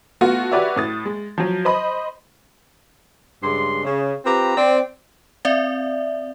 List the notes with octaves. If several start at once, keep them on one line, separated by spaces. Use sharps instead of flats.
A3 B3 F4 F#4
F#4 G4 B4 C#5 D5 E5
A2 D#6 A6
G#3
F3 F#3
C5 D#5 B5
G2 C#3 G#3 C6
C#3
C4 F4 G4 B4 A#5
C4 D5
C4 D5 E5